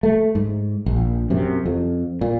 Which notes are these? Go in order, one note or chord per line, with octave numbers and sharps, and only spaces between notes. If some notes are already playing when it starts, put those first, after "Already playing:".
A3
G#2
A#1
F#2 C3
F2
A#2